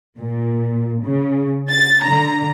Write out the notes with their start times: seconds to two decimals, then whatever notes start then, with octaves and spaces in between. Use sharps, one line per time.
0.19 A#2
1.04 C#3
1.70 A6
2.04 D3 A#5